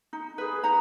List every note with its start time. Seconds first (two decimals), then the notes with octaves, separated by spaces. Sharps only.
0.13 D#4
0.38 G#4 B4
0.63 D#4 A#5